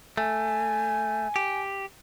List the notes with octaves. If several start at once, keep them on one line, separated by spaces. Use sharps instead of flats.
A3 G#5
G4